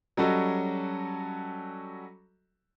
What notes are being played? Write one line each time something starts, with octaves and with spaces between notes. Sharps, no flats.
F#3 G3 C#4 F#4 A4 D#5